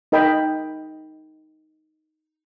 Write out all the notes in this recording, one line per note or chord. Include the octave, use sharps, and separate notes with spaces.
D#4 A#4 D#5 G5 B5